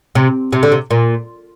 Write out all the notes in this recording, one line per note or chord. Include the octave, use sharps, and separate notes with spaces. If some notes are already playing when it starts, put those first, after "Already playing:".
C3
C3
D3
C3
A#2